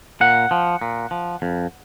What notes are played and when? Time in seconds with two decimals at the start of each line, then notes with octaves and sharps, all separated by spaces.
0.21 A#2 F#5
0.51 F3
0.81 A#2
1.11 F3
1.42 F2